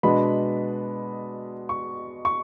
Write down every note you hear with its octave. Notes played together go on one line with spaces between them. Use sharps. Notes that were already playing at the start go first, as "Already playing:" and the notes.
B2 G#3 B3 D4 B5
C#6
C#6